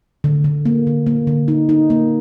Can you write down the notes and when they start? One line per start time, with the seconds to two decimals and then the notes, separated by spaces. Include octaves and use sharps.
0.24 D3
0.44 D3
0.65 A#3
0.87 D3
1.07 A#3
1.27 D3
1.48 D#4
1.69 D#4
1.90 A#3